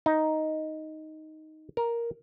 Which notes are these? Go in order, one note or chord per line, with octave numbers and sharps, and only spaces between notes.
D#4
A#4